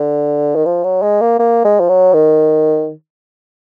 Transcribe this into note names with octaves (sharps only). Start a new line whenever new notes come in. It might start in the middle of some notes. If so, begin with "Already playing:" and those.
Already playing: D3
D#3
F3
F#3
G#3
A#3
A#3
G#3
F3
F#3
D#3